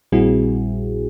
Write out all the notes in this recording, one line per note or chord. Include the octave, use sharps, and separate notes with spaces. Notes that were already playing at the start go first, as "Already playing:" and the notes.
A#1 A#2 G3 C4 E4 F#4 G#4